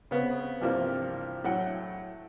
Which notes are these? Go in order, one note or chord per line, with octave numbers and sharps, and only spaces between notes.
C#3 B3 C4
G2 C3 E3 F3 G3 A#3
A2 F#3 F#5 G5